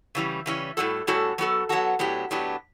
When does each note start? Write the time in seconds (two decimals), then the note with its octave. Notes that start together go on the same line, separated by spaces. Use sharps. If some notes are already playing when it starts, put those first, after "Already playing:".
0.15 C#3 E3 G3 C#4
0.46 C#3 E3 G3 C#4
0.77 A2 G3 C#4 F#4 A4
1.07 A2 G3 C#4 F#4 A4
1.38 F#3 B3 F#4 A4
1.69 F#3 B3 F#4 A4
1.99 A2 F#3 B3 D4 G4
2.31 A2 F#3 B3 D4 G4